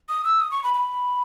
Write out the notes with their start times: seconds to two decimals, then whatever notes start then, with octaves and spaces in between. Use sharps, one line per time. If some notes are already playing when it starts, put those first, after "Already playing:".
0.09 D#6
0.24 E6
0.40 D#6
0.51 C#6
0.63 B5
0.74 B5